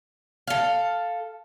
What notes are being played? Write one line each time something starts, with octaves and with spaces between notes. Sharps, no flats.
A4 F5